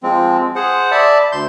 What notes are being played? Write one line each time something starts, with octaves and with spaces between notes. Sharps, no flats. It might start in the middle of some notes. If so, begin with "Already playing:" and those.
F3 G#3 C4
G#4 C5 F#5
D5 E5 A5 B5
D2 C6 G6